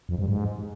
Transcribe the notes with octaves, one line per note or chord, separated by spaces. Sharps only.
F2
G2
G#2